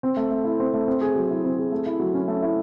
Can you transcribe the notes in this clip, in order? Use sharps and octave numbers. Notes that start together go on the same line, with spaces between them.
C4
A3
A3
E4
C4
A3
C4
G#4
F#3
E4
C4
G#4
A3
E4
F#3
C#4
A3
E4